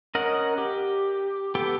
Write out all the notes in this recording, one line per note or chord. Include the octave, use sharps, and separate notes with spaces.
C#4 A#4 D#5 F#5
G4
B3 G4 A4 G5